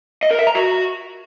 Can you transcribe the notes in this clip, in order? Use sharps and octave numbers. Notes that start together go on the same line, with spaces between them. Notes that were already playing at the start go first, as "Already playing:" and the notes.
D#5
A#4
E5
A#5
F#4